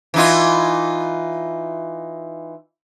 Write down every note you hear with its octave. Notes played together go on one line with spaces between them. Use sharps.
E3 D#4 F4